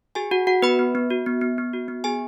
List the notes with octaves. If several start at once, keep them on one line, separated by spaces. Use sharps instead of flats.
F#4 G#4 G#5
F#4 F#5
F#4 F#5
B3 B4 B5
B3
B3
F#4
B3
B3
B3
F#4
B3
B3 G#4 G#5